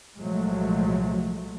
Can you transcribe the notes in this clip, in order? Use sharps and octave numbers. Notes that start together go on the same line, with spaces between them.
C2 A#2 F3 F#3 G#3 A3